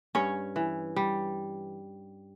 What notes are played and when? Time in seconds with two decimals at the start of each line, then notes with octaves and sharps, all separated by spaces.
0.15 G2 C#4 C#5
0.56 E3
0.96 G3